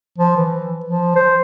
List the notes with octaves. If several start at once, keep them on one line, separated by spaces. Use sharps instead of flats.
F3
E3
F3
C5